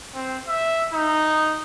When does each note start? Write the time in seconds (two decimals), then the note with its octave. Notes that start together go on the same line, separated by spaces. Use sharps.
0.15 C4
0.48 E5
0.93 D#4